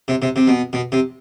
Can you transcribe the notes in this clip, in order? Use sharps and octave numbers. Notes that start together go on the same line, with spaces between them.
C3
C3
C3
B2
B2
C3